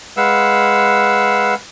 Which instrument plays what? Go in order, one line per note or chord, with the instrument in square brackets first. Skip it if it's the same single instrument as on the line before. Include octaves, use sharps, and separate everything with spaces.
[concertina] G#3 B4 F5 F#5 E6